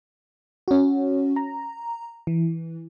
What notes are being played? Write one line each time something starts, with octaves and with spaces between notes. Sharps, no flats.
C#4 F#4
A#5
E3